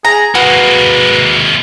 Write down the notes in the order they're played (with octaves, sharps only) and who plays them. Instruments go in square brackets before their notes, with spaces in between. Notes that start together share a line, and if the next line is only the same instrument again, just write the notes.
[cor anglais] G#4 [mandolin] A#5
[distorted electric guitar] G#3 A#3 [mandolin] F#4 [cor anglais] B4